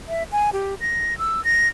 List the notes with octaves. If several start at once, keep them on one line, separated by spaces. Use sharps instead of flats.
E5
G#5
G4
A#6
E6
A#6